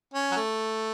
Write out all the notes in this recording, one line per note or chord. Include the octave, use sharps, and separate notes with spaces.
C#4
F#3
A3